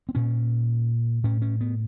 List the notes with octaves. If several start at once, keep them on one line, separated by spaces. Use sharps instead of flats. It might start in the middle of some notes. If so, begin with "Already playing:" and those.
C4
A#2 C#4
A2 C#4
C#4
B3